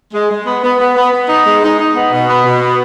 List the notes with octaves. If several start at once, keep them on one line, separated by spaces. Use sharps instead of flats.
G#3
G#3
B3
B3
B3
B3
B3
D#4
G#3
D#4
D#4
B3
B2
B3
B2
B3